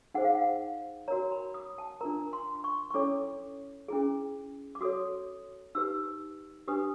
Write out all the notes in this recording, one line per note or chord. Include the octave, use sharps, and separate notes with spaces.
D#4 G#4 C5 F#5
F5
F#5
F#4 A#4 C#5 A#5
B5
D#6
A5
D4 F4 A#4 A#5
C6
C6
C#6
C#6
C#4 E4 A4 C#5 D6
C#4 E4 G#4
D6
F#4 A4 C#5 D#6
D#4 G4 B4 E6
D4 G4 B4 D#6